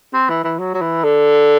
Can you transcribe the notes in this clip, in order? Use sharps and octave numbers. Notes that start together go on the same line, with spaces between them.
C4
E3
E3
F#3
F#3
E3
D3